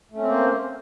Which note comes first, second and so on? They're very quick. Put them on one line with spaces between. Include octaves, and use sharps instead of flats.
A3 C#4 C4 A#3 C5